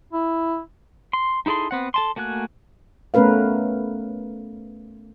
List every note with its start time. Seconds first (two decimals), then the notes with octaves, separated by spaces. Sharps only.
0.13 E4
1.13 C6
1.46 D#4 E4 G#4 A4 C6
1.71 B3 C4 F#5
1.94 A4 A5 C6
2.16 A3 A#3 F#4 G#5 F#6
3.14 A3 B3 C#4 A#4 B4 F5